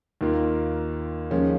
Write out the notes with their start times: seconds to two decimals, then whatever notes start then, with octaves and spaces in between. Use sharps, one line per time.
0.21 D#2 D#3 A#3 F4
1.31 D#2 C#3 F3 G#3 C#4